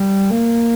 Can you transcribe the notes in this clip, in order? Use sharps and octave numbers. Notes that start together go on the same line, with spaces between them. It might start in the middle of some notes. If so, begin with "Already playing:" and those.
Already playing: G3
A#3